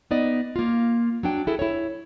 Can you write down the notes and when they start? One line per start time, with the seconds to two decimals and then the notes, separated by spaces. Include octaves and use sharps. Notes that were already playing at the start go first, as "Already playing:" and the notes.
0.11 B3 D#4 D5 D#5
0.56 A#3 F4
1.23 F#3 D4 G5
1.47 E4 G#4 A4
1.59 E4 C#5